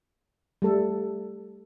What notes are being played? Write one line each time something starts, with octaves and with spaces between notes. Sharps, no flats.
G3 A3 A4